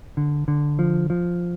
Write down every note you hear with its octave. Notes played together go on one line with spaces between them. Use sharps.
D3
D3
F3
F3